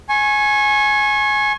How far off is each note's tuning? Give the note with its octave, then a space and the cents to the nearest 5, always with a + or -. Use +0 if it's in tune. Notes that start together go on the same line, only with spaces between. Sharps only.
G#5 +10 C#6 -30